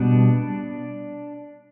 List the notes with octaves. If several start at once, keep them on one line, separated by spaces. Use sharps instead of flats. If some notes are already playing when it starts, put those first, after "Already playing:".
Already playing: B2 G3 B3 D4